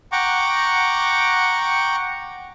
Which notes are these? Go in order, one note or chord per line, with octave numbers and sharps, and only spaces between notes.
F#5 G5 A#5 C#6 D6